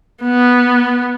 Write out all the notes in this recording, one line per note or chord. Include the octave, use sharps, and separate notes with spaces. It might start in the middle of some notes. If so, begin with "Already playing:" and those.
B3